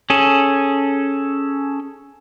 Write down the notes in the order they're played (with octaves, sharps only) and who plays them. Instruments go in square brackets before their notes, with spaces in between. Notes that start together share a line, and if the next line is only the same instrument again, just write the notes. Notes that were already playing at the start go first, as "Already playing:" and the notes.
[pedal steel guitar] C#4 G#4 A4